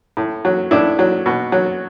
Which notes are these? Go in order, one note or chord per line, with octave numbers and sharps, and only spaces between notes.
A2
F#3
A2 D4 E4
F#3
B2
F#3